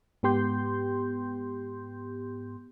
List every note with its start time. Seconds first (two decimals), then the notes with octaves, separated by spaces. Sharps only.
0.23 G#2 B3 G4 C6 G6